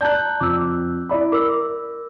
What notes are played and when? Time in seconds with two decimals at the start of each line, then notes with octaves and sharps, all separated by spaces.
0.01 D5 A5 A#5 F#6 G6
0.40 F2 D6 E6
1.09 E4 D5 B5
1.32 A#4 D6 E6